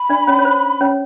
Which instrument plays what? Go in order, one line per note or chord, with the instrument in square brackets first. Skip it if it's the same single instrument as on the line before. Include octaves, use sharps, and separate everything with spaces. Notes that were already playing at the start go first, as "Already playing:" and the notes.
Already playing: [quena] B5
[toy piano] D4 D5
C#4 C#5
C#5
C5
C#4 C#5